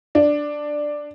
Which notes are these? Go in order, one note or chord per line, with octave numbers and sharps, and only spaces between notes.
D4